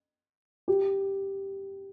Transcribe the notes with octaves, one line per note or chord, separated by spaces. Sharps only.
G4